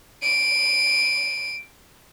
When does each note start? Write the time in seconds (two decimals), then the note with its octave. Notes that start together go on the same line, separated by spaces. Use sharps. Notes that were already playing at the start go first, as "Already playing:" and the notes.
0.23 D7 D#7